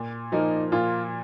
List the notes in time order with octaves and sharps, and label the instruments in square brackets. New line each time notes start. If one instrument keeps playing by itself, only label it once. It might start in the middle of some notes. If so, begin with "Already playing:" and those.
Already playing: [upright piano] A#2
[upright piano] F3 A#3 [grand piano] D#4
[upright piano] A#2 [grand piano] F4